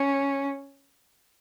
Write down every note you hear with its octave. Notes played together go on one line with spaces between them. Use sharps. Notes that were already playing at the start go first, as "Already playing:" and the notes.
Already playing: C#4